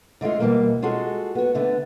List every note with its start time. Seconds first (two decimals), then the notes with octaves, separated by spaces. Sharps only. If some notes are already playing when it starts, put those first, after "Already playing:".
0.21 D3 G#3 A3 F4
0.40 D2 G#2 B2 E3 G3 A#3
0.82 G#3 F4 F#4 G#4 A4
1.35 B3 F#4
1.55 D3 A3 B3